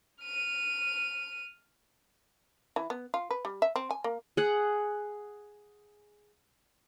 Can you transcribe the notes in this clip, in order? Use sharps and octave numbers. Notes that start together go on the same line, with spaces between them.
F6 D#7
E3
B3
F4
B4
G3
E5
C4
G#5
A#3
G#4 F#5